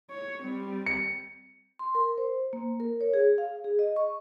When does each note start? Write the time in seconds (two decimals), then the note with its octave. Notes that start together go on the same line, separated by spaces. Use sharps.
0.11 C#5
0.42 G3 C4
0.86 C#7
1.79 C6
1.95 A#4
2.18 C5
2.53 A#3
2.80 A#4
3.01 C#5
3.14 G#4
3.38 F5
3.64 G#4
3.79 D#5
3.96 C#6